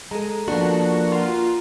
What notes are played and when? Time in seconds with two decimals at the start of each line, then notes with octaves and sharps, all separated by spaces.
0.11 G#3 A4 A#5
0.48 F3 A#3 B3 D4 F#4
1.12 F4 F#5 A#5